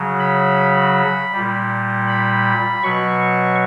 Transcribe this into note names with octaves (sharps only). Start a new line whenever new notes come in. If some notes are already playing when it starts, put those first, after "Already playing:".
Already playing: C#3 F#3
B5
A#2 G3
B5
B2 F#3 C#6